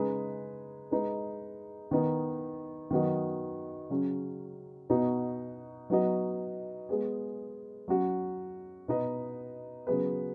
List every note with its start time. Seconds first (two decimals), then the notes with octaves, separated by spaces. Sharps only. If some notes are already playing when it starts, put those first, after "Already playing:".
Already playing: C#3 G#3 D#4 G#4 B4
0.91 G#3 D#4 B4
1.91 D#3 B3 D#4
2.91 D#3 F#3 B3 F#4 D#5
3.90 C#3 F#3 C#4
4.90 B2 B3 D#4 F#4
5.90 F#3 B3 D#4 F#4 D#5
6.89 G#3 B3 G#4
7.88 F#3 C#4 F#4
8.88 B2 B3 D#4 B4 D#5
9.87 C#3 F#3 B3 G#4 B4